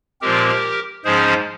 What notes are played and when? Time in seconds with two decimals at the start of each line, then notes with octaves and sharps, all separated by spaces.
0.21 A#2 F3 G#3 C4 G4 A#4
1.04 G#2 F3 G#3 C#4 G#4 C5